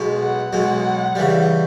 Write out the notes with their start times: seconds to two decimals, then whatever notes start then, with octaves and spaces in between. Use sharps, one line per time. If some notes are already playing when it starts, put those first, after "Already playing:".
Already playing: B1 B2 G#3
0.20 F#5
0.53 B1 B2 G#3
1.15 C#3 E3 G3